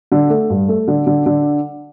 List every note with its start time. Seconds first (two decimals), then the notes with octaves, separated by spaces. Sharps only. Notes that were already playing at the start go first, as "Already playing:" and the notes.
0.12 D3
0.30 A3
0.50 G2
0.69 A3
0.88 D3
1.07 D3
1.26 D3